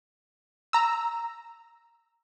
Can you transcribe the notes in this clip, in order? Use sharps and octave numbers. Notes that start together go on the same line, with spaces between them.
A#5 E6